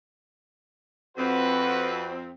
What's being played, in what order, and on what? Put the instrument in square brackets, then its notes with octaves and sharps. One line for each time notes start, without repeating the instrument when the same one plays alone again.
[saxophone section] F2 C4 [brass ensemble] F#4 B4